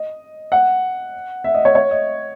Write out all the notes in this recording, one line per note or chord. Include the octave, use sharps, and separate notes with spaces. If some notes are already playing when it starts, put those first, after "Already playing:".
Already playing: D#5
F#5
E5
D#5
C#5
C#5
D#5